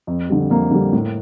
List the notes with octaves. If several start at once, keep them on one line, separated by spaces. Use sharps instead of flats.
F2
D3 G3
F2 A#3
D3 G3
A2